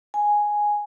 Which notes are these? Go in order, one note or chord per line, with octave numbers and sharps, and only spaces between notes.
G#5